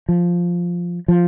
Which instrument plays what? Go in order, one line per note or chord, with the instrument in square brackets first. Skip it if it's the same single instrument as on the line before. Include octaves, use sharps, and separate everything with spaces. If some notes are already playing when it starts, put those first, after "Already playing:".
[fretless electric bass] F3
F3